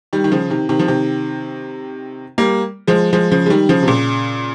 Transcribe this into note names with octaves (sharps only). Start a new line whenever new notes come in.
D#3 G3
D#3
C#3 F3
C3 D#3
C3 D#3
F3
C3 D#3
G3 A#3
F3 G#3
F3 G#3
C#3 F3
G#3
D#3 G3
C#3 F3
C3
A#2 C#3